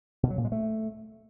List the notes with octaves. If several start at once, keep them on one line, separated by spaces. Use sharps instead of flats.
B2
F#3
A#2
G#3
A3